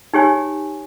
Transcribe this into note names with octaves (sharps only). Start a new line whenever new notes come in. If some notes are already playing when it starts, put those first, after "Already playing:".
D#4 G4 C#5 G#5